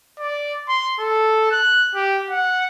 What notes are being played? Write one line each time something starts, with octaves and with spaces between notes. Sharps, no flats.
D5
C6
A4
F#6
G4
F#5